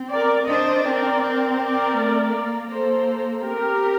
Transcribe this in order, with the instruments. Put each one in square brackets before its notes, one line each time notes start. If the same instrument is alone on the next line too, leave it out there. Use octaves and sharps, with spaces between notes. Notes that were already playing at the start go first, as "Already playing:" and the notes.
Already playing: [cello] C4
[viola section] A#4 D5
[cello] D4 [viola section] C5 D#5
[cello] C4 [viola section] A#4 D5
[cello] C4
[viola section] A#4 D5
[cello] A3
A#3
[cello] A#3 [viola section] A4 C5
[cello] C4 [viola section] G4 A#4